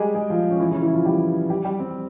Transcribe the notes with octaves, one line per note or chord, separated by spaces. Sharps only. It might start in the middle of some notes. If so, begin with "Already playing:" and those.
Already playing: G3 G#3 G4 G#4
G#3 G#4
F3 F4
C#4
E3 E4
C#3 C#4
E3 E4
F3 F4
G3 G4
G3 G4
G3 G4
C4